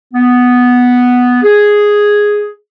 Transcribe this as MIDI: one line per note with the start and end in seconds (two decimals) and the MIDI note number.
0.14 1.39 59
1.43 2.50 68